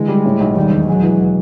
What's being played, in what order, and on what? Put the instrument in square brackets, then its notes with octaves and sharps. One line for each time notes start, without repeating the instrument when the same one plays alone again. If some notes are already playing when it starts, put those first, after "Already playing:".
Already playing: [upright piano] D3 E3 [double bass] G#3
[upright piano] G3
A2
B1
[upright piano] D#2 [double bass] G3
[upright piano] E1
[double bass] F#3 [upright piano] G#3
[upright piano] E3